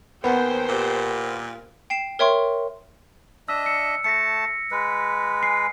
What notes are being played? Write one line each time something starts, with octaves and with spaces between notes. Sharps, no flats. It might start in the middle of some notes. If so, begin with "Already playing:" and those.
D#2 B3 A#4 C5 G5 G#5
A#2 G4 A#4
G5 C7 E7
A#4 C#5 E5 G5 C6 C#6
D4 D#5 E5 E6
C#7
A3 A5 A#6 B6 C#7
G#3 B4
G#5 C7